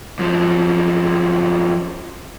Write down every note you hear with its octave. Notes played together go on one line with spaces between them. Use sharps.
F#2 F3